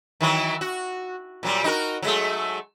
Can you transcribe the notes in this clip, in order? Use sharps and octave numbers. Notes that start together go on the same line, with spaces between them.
D#3 E3 F#3
F#4
A#2 F#3 G3
D#4 F#4 A#4
F#3 G#3 A3